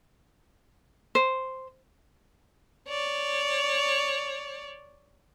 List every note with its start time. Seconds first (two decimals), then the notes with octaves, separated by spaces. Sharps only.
1.15 C5
2.89 C#5 D5